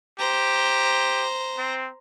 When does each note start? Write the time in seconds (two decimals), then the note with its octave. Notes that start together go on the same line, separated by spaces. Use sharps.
0.19 G4 C5 A#5
1.58 C4